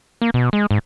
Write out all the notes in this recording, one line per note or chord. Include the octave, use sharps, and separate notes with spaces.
A#3
B2
G#3
G#2